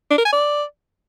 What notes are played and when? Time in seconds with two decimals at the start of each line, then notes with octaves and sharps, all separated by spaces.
0.11 D4
0.18 A#4
0.25 G#5
0.32 D5